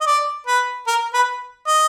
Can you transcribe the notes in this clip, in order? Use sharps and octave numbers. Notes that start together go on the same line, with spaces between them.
D#5
D5
B4
A#4
B4
D#5